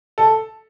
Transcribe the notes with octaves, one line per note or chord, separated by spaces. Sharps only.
A4